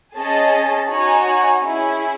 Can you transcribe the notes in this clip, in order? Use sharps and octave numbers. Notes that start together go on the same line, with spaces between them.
C#4 G#4 D#5 A5
D#4 F#4 C#5 G#5
C#4 E4 G#4